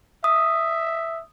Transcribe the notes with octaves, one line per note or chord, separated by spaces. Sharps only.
E5 D#6